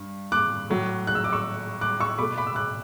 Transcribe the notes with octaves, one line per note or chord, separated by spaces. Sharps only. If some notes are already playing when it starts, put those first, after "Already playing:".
Already playing: G2
D6 F#6
A2 F#3 A3
F#6
E6
D6
C#6 E6
D6 F#6
C#6 E6
B2 A3 B5 D6
B5 D6
E6
D6 F#6